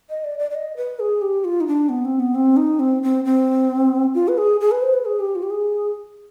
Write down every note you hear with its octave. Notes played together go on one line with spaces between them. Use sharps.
D#5
D5
D5
D5
D#5
B4
G#4
G4
F4
D#4
D4
B3
C4
B3
C4
D#4
C4
C4
C4
F4
B4
G#4
G#4
B4
C5
B4
G#4
G4
F4
G4
G#4